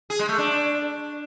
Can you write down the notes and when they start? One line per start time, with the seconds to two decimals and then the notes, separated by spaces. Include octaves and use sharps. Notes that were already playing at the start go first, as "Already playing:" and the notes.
0.10 G#4
0.19 G#3
0.29 A3
0.38 D4